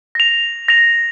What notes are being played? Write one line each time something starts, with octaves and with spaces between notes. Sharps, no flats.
A#6 F7
A#6 F7